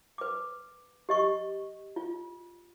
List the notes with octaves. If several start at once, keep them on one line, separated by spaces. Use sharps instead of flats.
B4 D6
G4 D#5 C#6
F4